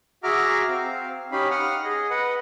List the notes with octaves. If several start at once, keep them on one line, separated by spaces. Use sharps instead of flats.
F#4 G#4 E5 A#5 D6 F6
C4 F5
C#4 D#4 G4 F5 B5
F#5 D#6 F6
G#4 D#5
B4 D#5 F#5